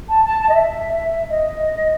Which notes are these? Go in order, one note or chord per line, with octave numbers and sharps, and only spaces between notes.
A5
A5
A5
D#5
E5
D#5